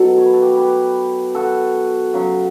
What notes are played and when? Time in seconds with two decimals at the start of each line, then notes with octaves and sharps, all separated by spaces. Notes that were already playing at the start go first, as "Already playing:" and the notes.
Already playing: B2 F#3 A4
0.18 C#5
0.26 B4
0.34 A4
0.42 G4 B4
0.57 G4 B4
1.35 F#4 A4
2.14 C#3 F#3